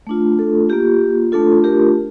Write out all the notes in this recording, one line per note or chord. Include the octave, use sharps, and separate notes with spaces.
A3 D4 F4
A4
A#3 F4 G4
A3 D4 F4 A4
G4 A#4